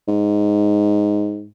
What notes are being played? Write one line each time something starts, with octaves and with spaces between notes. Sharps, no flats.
G#2